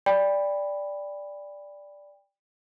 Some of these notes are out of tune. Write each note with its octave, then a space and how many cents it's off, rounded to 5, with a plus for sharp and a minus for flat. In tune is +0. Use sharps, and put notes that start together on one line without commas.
D5 -5 G5 +25 B5 +0